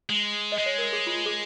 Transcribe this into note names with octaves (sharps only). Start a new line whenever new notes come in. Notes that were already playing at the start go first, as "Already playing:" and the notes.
G#3
D#5
G#3
C#5
A#4
G#4
F4
G#4